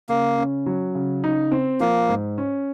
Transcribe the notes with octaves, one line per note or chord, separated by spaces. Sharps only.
C#3 A#3
C#4
F#3
C#3
D#4
C4
F3 A#3
G#2
C#4